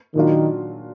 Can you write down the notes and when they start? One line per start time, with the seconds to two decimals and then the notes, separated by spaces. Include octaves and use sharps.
0.15 A#2 D#3 F#3 D4 F4